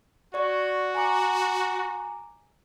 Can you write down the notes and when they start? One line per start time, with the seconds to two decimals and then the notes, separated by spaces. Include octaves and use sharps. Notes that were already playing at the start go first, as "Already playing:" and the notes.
0.34 F#4 D5 C#6
0.95 G#5 A#5 D6